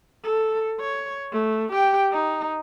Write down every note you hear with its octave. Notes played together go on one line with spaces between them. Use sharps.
A4
C#5
A3
G4 G5
D#4